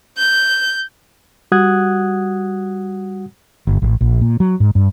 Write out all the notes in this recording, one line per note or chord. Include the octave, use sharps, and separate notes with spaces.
G6
G3 F#4 F#5 D#6 F#6 G#6
G1
A1
A#1
A#2
F#3
G#2
G2